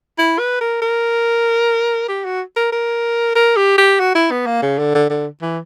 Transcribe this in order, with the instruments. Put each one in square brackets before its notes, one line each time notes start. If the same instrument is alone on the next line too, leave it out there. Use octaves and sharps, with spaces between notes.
[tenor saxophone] E4
B4
A#4
A#4
G4
F#4
A#4
A#4
A#4
G4
G4
F#4
E4
B3
A#3
C#3
D3
D3
D3
E3